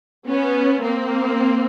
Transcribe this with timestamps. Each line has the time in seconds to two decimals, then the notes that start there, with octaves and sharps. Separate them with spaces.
0.28 B3 C#4
0.82 A#3 C4